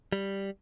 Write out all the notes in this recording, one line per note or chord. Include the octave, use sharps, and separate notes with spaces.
G3